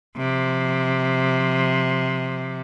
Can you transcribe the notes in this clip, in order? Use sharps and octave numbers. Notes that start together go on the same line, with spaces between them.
C3 F3